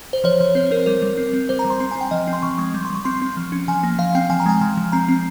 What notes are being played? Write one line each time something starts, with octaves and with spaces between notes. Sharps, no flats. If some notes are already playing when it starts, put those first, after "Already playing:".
C5
F3 C#5
F3
C4 C5
C4 A#4
G3 A#4
G3
C4
C4
G3 C5
A#5
G3
C6
C4 A#5
G#5
C4
G5
F3 D#5
C4
C6
F3 C#6
G#3 C#6
G3
C6
G3 C#6
C4 C6
C4
F3
C#4
F3 G#5
A#3
F3 F5
C4 G5
F3 G#5
A#5
G#3 G#5
F3
F3
C4 A#5
C4